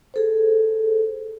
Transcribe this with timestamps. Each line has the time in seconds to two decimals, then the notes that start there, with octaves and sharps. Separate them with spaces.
0.14 G#4 A4 C5